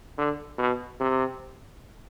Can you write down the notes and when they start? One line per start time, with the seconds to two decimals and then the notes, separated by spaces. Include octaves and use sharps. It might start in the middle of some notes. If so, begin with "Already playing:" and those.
0.18 D3
0.58 B2
1.00 C3